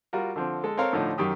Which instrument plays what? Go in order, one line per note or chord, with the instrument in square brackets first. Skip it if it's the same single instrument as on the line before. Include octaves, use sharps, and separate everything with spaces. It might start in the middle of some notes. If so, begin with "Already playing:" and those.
[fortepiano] G3 F4 F#4 A#4
D3 F3 C4
G#3 A4
C4 A4 A#4 C#5 F5 C6
A2 D3 F3 D#4
F#2 D#3 G4 D#6